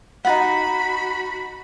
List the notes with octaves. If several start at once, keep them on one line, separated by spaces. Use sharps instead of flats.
D#4 F4 F#4 F#5 B5